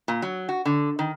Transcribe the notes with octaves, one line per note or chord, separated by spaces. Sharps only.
A#2
F#3
F#4
D3
D#3